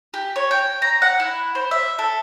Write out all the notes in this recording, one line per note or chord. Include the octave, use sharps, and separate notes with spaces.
G4
C#5
G5
A#5
F#5
E4
C5
E5
A4